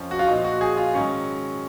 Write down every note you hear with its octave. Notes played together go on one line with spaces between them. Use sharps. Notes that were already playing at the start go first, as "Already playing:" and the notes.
Already playing: F2 F3 C#4
F#4
F4
A#2 F3 D#4
F#4
G#4
F4
G#2 D#3 F#3 C#4